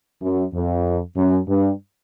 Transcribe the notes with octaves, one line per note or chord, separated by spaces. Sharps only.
F#2
F2
F#2
G2